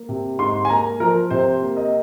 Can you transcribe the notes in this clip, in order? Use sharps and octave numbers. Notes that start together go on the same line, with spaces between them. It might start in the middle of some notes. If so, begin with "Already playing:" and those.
Already playing: A#3
C3
G#2 C6
G#5
A#3 A#5
F3 A#4
C3 C5
A#3
D#5